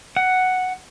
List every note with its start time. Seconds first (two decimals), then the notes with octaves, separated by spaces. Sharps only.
0.17 F#5